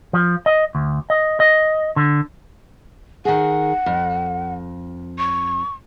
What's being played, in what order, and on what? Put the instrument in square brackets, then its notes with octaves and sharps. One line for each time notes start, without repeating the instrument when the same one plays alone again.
[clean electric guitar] F3
D#5
D2
D#5
D#5
D3
[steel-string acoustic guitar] D#3 G#4 [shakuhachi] F#5
[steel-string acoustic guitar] F2
[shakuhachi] C#6